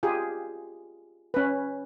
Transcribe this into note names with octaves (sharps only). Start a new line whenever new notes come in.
F4 G4 G#4
C#4 B4